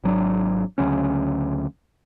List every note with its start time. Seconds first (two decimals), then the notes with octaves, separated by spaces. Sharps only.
0.04 G#1 F#3 D4
0.78 D2 C#3 F#3 C#4